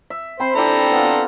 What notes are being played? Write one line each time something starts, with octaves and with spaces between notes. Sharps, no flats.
E5
C4 C5 B5
D4 E4 G4 A4 A#5
B3 F4